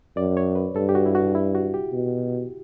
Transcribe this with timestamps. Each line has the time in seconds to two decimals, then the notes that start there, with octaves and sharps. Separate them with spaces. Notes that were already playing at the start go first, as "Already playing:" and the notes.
0.16 F#2 D5
0.37 C#5
0.55 B4
0.75 G2 A4
0.89 G4
0.95 F#4
1.06 E4
1.15 F#4
1.35 E4
1.55 F#4
1.74 G4
1.93 B2